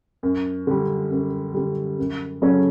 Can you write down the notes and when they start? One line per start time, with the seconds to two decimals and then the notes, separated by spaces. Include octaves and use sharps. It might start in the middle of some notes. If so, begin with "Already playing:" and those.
0.23 F#2
0.67 D3 G3
1.11 F#2
1.54 D3 G3
1.99 F#2
2.42 C#3 F#3 A3 C#4